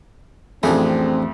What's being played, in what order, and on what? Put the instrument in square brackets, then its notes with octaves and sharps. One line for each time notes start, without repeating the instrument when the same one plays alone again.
[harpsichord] A1 D4 G#4 [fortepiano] F2 A3 [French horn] C4